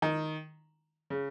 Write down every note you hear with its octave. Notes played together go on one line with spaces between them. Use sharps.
D#3
C#3